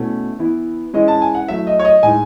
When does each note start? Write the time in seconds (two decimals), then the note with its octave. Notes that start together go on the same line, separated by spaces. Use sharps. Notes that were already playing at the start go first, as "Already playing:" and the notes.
Already playing: B2 A3 C#4 E4
0.39 E3 B3 E4
0.93 E3 G#3 C#4 E4 D#5
1.08 A5
1.22 G#5
1.35 F#5
1.48 F#3 A3 E4 E5
1.67 D#5
1.80 C#5
1.85 D#5
2.03 A2 G#3 D#4 G#5